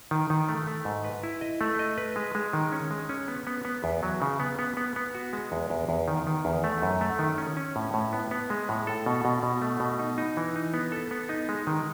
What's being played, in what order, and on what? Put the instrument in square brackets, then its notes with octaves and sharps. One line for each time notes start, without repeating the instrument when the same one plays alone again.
[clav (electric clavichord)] D#3
D#3
A3
A3
G#2
B4
E4
D#5
A3
D#5
B4
G#3
G#3
D#3
C#4
G#3
C#4
B3
B3
B3
E2
F#3
C#3
B3
B3
B3
B3
F#4
G#3
E2
E2
E2
D#3
D#3
E2
A3
F#2
A3
D#3
C#4
C#4
A2
A2
B3
B3
G#3
A2
A4
B2
B2
B2
A3
B2
D#4
D#4
E3
D#4
B3
A4
B3
D#4
G#3
D#3